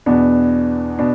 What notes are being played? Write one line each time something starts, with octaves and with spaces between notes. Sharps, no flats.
E2 B2 B3 D4
B2 B3 D4